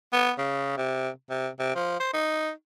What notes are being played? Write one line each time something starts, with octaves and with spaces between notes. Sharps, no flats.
B3
C#3
C3
C3
C3
F3
C5
D#4